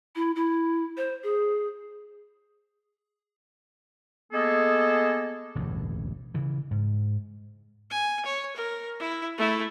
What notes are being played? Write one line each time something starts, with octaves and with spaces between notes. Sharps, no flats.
E4
E4
C5
G#4
G#3 A#3 B3 G#4 A4
E1 A1 D2 G2
C#3 E3
G#2
G#5
C#5
A#4
E4
A3 E4